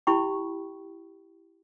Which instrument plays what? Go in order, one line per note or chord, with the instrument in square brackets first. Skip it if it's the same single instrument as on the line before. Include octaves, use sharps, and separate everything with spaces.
[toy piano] E4 G4 G5 B5 C#6